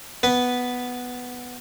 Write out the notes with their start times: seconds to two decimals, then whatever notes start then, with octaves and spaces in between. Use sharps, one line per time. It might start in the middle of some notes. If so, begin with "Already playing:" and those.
0.23 B3 B4